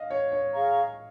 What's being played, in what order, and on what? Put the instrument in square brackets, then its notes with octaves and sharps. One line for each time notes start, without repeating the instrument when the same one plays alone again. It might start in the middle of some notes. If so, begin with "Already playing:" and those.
Already playing: [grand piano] D#5 F5
C#5
C#5
[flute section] G#4 F5 A#5 C#6